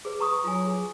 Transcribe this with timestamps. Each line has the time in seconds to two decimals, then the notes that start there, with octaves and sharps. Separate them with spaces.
0.05 G#4 B4
0.20 A#5 C#6 D#6
0.44 F#3 F4 G#5
0.66 G#4